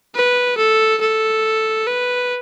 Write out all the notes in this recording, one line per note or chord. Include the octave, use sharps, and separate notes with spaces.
B4
A4
A4
B4